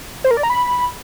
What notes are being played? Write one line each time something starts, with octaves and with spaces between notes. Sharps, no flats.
C5
A#4
D5
A#5
B5